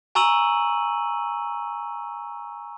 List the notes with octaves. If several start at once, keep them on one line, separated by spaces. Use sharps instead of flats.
G#5 A#5 C#6 E6 D#7 F#7